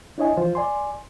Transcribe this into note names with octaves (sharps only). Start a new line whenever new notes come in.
D4 E4 C#5 D#5 G#5
E3 F3 F4 C5
D5 G#5 C6